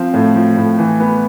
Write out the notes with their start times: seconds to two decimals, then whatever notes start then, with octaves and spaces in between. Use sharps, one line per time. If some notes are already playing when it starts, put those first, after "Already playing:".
Already playing: F3 C4
0.13 A2
0.35 F3
0.57 A2
0.78 E3
1.00 B3